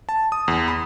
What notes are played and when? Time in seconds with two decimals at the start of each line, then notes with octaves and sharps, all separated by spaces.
0.09 A5
0.32 D#6
0.48 E2
0.68 B5